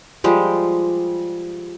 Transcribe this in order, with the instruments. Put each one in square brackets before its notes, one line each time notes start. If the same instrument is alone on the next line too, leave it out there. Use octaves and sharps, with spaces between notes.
[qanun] F3 G3 G#3